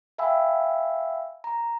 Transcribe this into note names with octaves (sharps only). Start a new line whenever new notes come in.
E5 F5 G5 G#5 B5 E6
A#5